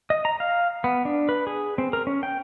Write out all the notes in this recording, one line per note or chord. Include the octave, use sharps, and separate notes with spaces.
D#5
A#5
F5
B3
D4
B4
G#4
C4
A#4
C#4
G5